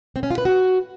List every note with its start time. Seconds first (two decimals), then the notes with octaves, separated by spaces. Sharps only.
0.16 C4
0.23 C#4
0.30 F4
0.38 B4
0.45 F#4